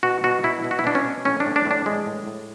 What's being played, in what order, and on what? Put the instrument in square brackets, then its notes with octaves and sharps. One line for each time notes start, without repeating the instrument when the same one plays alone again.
[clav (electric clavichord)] B2 F#4
B2 F#4
B2 E4
B2
F#4
E4
B2 D4
C#4
B2
A2 C#4
D4
A2
D4
A2
D4
E3 G#3
A2
A2